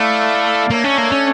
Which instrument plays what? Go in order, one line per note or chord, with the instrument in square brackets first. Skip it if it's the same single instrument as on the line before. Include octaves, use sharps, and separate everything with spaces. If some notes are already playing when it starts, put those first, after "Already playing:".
Already playing: [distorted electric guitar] A3 [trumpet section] E4 A4 D5 F5
[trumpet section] A3 D4 A4 C#5 [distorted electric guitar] A#3
[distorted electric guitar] C#4
A#3
C#4